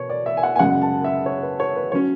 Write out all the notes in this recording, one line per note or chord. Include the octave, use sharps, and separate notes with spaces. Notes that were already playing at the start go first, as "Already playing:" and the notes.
Already playing: B2 B4 C#5
D5
E5
G#5
F#5
G#5
F#2 C#3 G#3 F#5
A5
E5
C#5
B4
C#5
B4
F#3 C#4 C#5